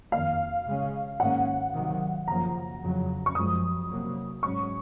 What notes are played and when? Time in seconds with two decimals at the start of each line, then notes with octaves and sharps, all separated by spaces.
0.12 F2 D#3 A#3 F5
0.67 C#3 G#3 C#4
1.20 G#2 D#3 A#3 C#4 F#5
1.73 C3 D#3 F#3
2.27 F#2 C#3 F3 A#3 A#5
2.82 F2 C#3 F#3
3.26 C#6
3.35 F#2 F3 G#3 D#6
3.90 C3 F#3 A#3
4.43 G#2 F#3 C#4 C#6